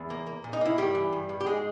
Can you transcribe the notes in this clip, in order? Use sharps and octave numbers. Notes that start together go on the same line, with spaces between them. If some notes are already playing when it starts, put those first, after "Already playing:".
Already playing: E2
A#3
A#3
A#2
D#4
A#3 E4
G2 G3 G4
E3
G2
G2
G4
G#2 G#3 G#4